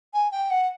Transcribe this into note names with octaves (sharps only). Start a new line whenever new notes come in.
G#5
G5
F#5